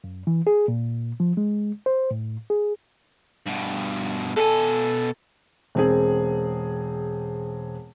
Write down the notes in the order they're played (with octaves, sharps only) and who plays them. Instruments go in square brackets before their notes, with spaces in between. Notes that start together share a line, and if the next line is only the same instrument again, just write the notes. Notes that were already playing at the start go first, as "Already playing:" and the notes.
[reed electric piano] F#2
E3
G#4
A#2
F3
G#3
C5
A2
G#4
[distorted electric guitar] G2 B2
[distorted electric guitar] B2 G#5 [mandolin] A4
[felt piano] E1 C4 G#4